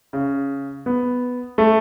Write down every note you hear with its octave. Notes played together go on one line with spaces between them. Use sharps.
C#3
B3
A3